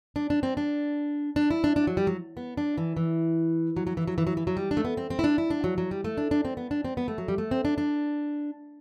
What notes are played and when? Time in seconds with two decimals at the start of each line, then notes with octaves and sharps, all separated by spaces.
0.16 D4
0.30 D4
0.43 C4
0.57 D4
1.36 D4
1.50 E4
1.64 D4
1.76 D4
1.87 F#3
1.97 G3
2.07 F#3
2.37 B3
2.57 D4
2.77 E3
2.97 E3
3.77 F#3
3.87 F#3
3.97 E3
4.07 F#3
4.18 E3
4.27 F#3
4.37 E3
4.47 F#3
4.57 G3
4.71 D4
4.77 A3
4.85 B3
4.97 C4
5.10 C4
5.19 E4
5.24 D4
5.38 E4
5.50 D4
5.64 F#3
5.78 F#3
5.91 G3
6.04 A3
6.17 D4
6.31 D4
6.45 C4
6.57 B3
6.71 D4
6.85 C4
6.97 B3
7.08 A3
7.18 F#3
7.28 G3
7.38 A3
7.51 C4
7.65 D4
7.78 D4